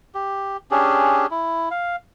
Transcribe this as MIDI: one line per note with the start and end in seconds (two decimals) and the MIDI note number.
0.15 0.57 67
0.71 1.26 61
0.71 1.26 62
0.71 1.26 67
0.71 1.26 68
1.31 1.69 64
1.71 1.96 77